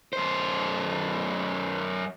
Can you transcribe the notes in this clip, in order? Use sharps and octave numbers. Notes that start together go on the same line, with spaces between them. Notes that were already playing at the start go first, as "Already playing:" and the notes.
F#2 C5